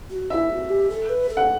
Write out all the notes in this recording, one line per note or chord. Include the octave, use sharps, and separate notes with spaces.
F#4
E4 F#4 E5
F#4
G4
A4
B4
A4
F#5